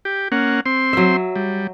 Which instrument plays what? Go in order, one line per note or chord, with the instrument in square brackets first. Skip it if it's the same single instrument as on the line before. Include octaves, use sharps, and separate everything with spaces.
[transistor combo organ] G4
A#3 C#4 F#5
C4 C6
[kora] F#3 E5
[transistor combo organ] G3